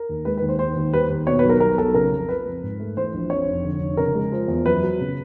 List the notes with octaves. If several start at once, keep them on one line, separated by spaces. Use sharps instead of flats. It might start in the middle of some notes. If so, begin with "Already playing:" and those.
Already playing: A#4
D#2
G#3 B4
D#2 B4
C5
D#3 C5
D#2
G3 B4
D#2
B2 C#5
B1 B4
A#4
G3 A#4
B1 A4
C#3 A#4
F2
F3 B4
F2
G#2
A3
E3 C5
A#1
F2 C#5
F1
D3
F1
C#3 A#4
G#3
F3
E2
F#2 B4
F#3
C#3